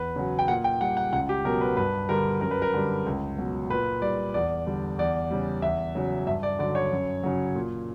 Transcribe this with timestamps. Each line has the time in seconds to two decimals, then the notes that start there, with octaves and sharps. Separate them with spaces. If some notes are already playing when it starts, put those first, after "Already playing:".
Already playing: E2 B4
0.16 C#3 F#3
0.39 G5
0.48 A#2 F#5
0.64 G5
0.81 G3 F#5
0.97 F#5
1.12 C#2 F#5
1.29 G4
1.45 B2 F#3 A#4
1.61 B4
1.77 G2 B4
2.09 D3 G3 A#4
2.41 F#2 A#4
2.51 B4
2.62 A#4
2.74 D3 G3
3.06 C#2
3.38 B2 F#3
3.70 A#2 B4
4.02 G3 D5
4.34 E2 D5
4.66 D3 G3
4.98 E2 D5
5.31 C#3 G3
5.62 E2 E5
5.95 C#3 F#3
6.27 G2 E5
6.43 D5
6.59 D3 F#3 D5
6.75 C#5
6.92 F#2
7.23 C#3 F#3
7.55 A#2